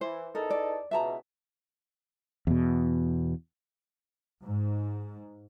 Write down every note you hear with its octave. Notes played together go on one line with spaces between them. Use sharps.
E3 C5
E2 D#4 A4 A#4
D5
C#2 B2 E3 E5 A5 A#5
E2 B2
G#2